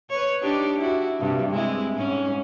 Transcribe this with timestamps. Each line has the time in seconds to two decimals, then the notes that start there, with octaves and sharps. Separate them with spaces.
0.10 B4 C#5
0.42 D4 D#4 G4
0.77 E4 F#4
1.20 G2 C3
1.51 G#3 C4 E4
1.96 G#2 C#4